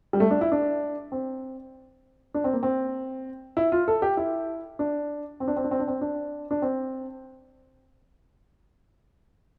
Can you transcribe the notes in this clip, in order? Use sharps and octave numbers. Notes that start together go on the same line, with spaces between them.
G3
A3
D4
E4
D4
C4
D4
C4
A#3
C4
E4
F4
A4
G4
E4
D4
C4
D4
C4
D4
C4
D4
C4
D4
D4
C4